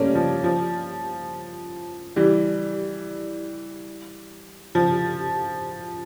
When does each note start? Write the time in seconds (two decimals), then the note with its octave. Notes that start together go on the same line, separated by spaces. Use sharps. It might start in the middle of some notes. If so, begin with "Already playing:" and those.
Already playing: G3 A3 A#3 C#4
0.15 F3
0.44 F3
2.16 E3 G3
4.75 F3